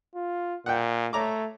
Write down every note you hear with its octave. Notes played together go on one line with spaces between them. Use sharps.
F4
A#2 F#5 G5
A3 C#5 A#5 D6